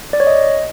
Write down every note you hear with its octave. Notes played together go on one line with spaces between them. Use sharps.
D5
C#5
D#5